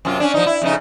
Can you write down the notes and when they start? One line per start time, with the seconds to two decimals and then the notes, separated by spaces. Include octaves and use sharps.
0.05 F#2 C3 F4
0.20 C#4 D4
0.34 F3 D#4
0.46 E4
0.62 F2 C#3 D#4